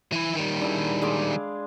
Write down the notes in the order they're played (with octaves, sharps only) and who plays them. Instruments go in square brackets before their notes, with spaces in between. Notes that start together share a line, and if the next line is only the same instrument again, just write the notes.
[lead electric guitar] E3 E4
D#3 G3
[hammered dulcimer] D4 E4 G#4
G#3 F5 D6